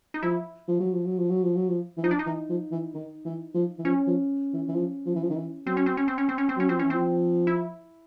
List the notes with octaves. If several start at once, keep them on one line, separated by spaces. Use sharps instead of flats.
D#4
F3 E4
F3
F#3
F3
F#3
F3
F#3
F3
F#3
F3
E3
F3 D#4
D4
D#4
E3
F3
E3
D#3
E3
F3
E3
F3 C#4
F3
E3
E3
F3
F3
E3
F3
D#3
E3
F#3 C4
C#4
C4
C#4
C4
C#4
C4
C#4
C4
F#3 C#4
F3 C4
E3 C#4
F3 C4
E4